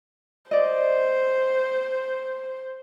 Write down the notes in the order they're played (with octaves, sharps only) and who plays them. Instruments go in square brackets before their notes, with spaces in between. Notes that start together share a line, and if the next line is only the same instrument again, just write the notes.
[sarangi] C5 [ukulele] D5 D#5